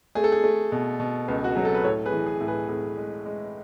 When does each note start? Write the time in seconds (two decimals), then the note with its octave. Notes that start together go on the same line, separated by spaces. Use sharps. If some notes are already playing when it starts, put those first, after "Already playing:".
0.15 A3 G#4
0.24 A4
0.32 G#4
0.44 A3
0.72 B2
1.00 B2
1.28 C#2
1.44 F#4
1.55 F#3 G#4
1.65 A4
1.74 B4
1.84 A2 A4 C#5
2.06 G#4 B4
2.12 E3
2.26 G#4
2.41 A2
2.48 G#4 B4
2.69 A2 G#4
2.97 G#3
3.26 G#3